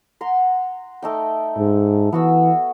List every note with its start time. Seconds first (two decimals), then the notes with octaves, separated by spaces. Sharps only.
0.21 F#5 A#5 C6
1.02 A3 D#4 G5
1.57 G#2
2.12 E3 B3 F#4 E6